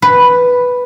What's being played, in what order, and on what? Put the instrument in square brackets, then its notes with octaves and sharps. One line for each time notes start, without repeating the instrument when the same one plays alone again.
[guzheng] B4